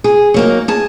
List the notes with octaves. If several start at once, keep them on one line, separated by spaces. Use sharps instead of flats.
G#4
F#3 A#3 D#4
G#4 A5